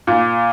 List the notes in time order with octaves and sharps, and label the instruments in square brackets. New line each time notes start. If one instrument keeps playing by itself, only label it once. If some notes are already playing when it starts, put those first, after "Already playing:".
[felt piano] A#2